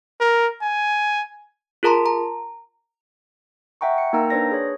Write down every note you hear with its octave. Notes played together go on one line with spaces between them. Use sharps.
A#4
G#5
F4 G#4 A#4 A5 A#5 C6
A#5
E5 F#5 G5 A#5 C#6
C#7
A#3 D#4 A#4 G5 A#5 E6
D4 B4 C5 D5 A#6
G#4 C#5